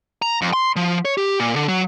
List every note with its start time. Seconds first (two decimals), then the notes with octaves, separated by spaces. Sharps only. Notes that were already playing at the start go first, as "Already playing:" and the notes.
0.22 A#5
0.42 F2
0.53 C6
0.76 F3
1.05 C#5
1.18 G4
1.40 A#2
1.56 D3
1.68 F#3